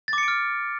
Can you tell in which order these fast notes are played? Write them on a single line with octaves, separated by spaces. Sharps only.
A6 D6 C#7 D7 F6